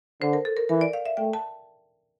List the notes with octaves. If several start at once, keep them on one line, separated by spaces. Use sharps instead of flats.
D3 C5
A#4
A4
A#4
E3 A#4
D5
F5
E5
A3 G5
A5